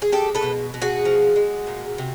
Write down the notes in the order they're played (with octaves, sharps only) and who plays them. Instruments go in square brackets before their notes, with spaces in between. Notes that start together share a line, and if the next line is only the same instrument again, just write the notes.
[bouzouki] G#4
G#3 G4 A4
A4 B4
B2
B2
F#4 G#4
F3
G#3
A#2
C3